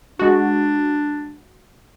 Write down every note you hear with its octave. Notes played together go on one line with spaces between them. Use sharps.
G#3 D4 F#4